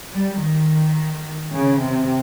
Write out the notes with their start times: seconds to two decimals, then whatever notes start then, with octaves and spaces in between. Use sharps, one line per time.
0.14 G3
0.42 D#3
1.54 C#3
1.83 C3